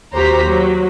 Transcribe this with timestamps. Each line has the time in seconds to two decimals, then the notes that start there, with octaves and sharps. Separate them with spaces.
0.13 D#2 F#4 G4 C5 A#5 B6
0.45 F#3